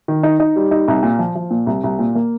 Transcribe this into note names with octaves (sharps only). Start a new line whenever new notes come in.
D#3
D#4
D#4
G3
D#4
C2
A#2
F3
F3
A#2
C2
C2
A#2
A#3